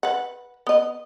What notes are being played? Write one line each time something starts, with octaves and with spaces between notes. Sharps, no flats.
B4 F#5
B3 D#5